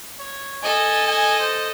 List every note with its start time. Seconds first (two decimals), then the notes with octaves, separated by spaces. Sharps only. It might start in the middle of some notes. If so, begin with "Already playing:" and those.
0.19 C#5
0.63 A4 D#5 G#5
1.07 G#5
1.39 C5